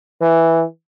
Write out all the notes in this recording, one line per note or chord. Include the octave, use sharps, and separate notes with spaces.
E3